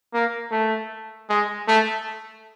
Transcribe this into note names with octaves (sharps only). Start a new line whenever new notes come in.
A#3
A3
G#3
A3